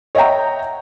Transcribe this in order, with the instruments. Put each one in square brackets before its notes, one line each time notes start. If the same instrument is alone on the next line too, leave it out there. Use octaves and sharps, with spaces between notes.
[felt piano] C#5 D#5 E5 F#5 G5 A#5